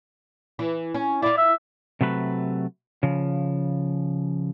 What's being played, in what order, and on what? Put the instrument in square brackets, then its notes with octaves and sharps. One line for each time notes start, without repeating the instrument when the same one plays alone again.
[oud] E3
C#4
[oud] E4 F4 [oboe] D5
[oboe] E5
[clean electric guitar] C3 F#3 A3 B4
C#3 F3